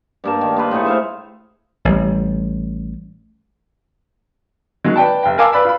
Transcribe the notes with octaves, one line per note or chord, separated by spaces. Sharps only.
G2 A#3 A5
D#3
A#3 F4 B4
A2 D#4 G#4 C#6
C5 E5 F5
A1 G3
D#3 F#3 G#3
B4 D5 G5 A5
F1 G5
A#4 F5 G#5 A5 D6 E6
B4 D5 B5 E6
F4 B5